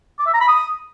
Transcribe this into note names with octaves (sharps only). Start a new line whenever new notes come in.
D6
E5
A#5
B5
D#6